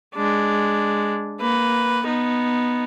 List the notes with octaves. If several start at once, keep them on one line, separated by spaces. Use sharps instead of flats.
G#3 D4
A#3 B4
B3 D#4